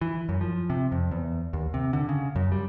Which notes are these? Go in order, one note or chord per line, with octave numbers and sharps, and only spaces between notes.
E3
F#2
F3
C3
F2
E2
D#2
C3
D3
C#3
F#2
G3